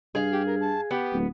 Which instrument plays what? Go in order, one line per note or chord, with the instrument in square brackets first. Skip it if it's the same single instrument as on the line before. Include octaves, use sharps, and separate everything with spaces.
[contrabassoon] G2 [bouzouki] G#4 F5
[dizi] G4
A#4
A5
[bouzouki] B3 [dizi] G4
[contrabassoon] D1